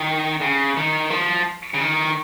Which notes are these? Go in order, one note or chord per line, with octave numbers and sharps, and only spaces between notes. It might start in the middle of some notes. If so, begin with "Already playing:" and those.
Already playing: D#3
C#3
D#3
F3
C#3
D#3